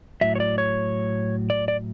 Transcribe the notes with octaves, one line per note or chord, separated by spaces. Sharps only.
A2 F#3 E5
C#5
D5
C#5
D5
D5